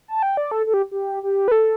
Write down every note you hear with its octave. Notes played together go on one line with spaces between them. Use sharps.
A5
G5
D5
A4
A4
G4
G4
G4
B4
A4